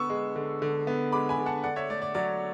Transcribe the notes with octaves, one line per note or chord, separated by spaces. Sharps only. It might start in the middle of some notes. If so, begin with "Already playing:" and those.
Already playing: D3 B3 C#6 E6
G#3
D3
D3
B3
G#3 B5 D6
G#5 B5
D3
F#5 A5
D3 D5 F#5
C#5 E5
A3 D5
D5
F#3 D5